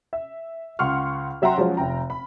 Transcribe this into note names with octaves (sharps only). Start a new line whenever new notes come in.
E5
C#2 F#5 C6 C#6 F6
F#3 E5 F#5 G5 A#5 C6
F3 F#3 G#3 C#4
F1 G5 A#5
B5